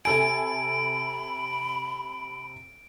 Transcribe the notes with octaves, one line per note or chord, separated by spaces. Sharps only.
C3 A4 G#5 B5 D7